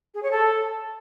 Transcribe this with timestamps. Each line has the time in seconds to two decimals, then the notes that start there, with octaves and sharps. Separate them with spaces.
0.14 G#4
0.22 C#5
0.31 A4